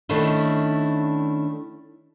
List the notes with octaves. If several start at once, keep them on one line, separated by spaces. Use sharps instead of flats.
D#3 A3 C#4 D4 E4